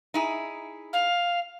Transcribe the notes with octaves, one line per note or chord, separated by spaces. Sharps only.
D#4 E4 G#4
F5